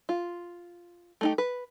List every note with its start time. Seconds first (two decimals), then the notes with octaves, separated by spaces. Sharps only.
0.09 F4
1.21 A3 D#4 G4
1.38 B4